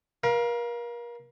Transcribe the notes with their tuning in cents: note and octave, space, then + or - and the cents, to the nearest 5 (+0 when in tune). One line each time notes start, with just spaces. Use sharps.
A#4 +35 F5 +0